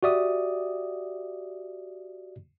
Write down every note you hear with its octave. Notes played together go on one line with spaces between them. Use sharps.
F#4 G4 D5 E5 D#6